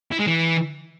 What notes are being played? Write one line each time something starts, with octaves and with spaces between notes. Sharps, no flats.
E4
G#3
E3